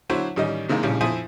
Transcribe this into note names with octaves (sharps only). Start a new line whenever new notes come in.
D3 F#3 E4 C5 C#5
A1 D#3 G3 C#4 D#5
A2 C3 D#3 G#3 A#3
A#1 A2 C#3 G3
F2 E4 C5 E5 G#5 D#6